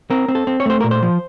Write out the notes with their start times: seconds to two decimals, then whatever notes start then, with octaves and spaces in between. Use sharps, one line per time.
0.10 C4 A#4
0.28 C4
0.35 A4
0.47 C4
0.60 C#5
0.66 A3 C5
0.81 A#2 A#4
0.91 C5
1.03 F3